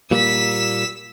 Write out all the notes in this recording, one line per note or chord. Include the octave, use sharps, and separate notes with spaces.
A#2 G3 A#3 E6 B6